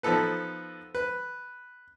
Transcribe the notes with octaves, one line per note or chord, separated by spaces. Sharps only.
F3 B3 D#4 A4 B4
B4